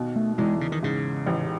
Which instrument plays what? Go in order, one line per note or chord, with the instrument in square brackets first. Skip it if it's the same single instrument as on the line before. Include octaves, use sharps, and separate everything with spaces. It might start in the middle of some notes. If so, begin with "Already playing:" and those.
Already playing: [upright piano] D#2 B2
[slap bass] A3
[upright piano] E2 [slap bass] G#3
[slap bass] C#3
D#3
[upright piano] G#2 [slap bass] C#3
[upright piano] A1